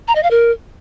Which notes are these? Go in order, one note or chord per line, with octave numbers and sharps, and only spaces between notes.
A#5
D#5
F5
A#4